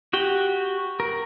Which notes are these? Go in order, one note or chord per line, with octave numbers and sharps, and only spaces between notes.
F#4 G4 G5
A#4